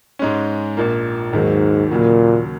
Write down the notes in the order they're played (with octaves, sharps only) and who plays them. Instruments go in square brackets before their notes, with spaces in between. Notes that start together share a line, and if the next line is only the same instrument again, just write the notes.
[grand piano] G#2 G#3 C#4
A#1 A#2 A#3
[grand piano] D#2 D#3 F#3 A#3 [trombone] G#2
[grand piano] D#2 C#3 F#3 A#3 [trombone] A#2